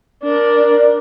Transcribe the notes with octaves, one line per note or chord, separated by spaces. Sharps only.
D4 A#4